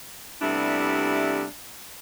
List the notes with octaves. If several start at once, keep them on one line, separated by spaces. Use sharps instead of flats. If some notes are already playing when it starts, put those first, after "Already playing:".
C3 G3 A3 B3 D4 E4